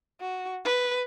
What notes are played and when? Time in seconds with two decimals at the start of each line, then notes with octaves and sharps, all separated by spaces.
0.21 F#4
0.65 B4